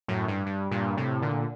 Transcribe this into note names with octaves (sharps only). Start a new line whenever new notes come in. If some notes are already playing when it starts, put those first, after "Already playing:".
F#2 A2
G2
G2
G2 A#2
A2 C3
A#2 D3